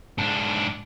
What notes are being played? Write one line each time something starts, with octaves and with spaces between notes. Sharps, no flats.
G#2 D4